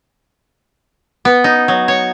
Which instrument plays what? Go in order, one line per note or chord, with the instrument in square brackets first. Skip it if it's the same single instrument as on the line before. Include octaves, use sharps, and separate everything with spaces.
[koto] B3
D#4
F#3
C#5